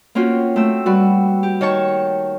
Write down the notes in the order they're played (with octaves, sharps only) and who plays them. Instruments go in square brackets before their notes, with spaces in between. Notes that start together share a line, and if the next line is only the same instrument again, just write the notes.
[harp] A#3 C4 C#4 F4 F#4
A3 C4 E6
G3 F#4 B4
G4
D#3 C#5 A5 C#6